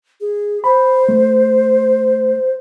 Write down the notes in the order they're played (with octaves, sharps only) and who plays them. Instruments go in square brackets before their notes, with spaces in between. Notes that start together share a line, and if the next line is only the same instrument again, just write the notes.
[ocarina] G#4
[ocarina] C5 [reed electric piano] B5
[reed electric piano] A3